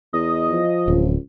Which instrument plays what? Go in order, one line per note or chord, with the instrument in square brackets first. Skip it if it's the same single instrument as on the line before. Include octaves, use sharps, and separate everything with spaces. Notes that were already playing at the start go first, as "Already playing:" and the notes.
[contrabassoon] E2 [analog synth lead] D#5
[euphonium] F3
[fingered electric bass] D1 [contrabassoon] C#2